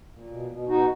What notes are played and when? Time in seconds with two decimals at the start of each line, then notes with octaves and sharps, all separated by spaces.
0.12 A#2
0.31 B2
0.50 B2
0.68 B2 D#4 F#4